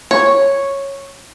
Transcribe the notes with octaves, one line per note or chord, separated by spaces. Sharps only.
C#5